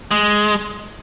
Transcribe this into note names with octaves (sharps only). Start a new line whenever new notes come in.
G#3